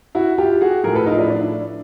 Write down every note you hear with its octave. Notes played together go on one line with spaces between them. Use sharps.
E4 F#4
F4 G4
F#4 G#4
A2 F3 G#4 A#4
A4 B4
D#4 F4
D4 E4
D4